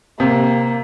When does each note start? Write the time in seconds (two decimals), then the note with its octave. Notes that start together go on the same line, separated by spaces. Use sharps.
0.20 C3 A#3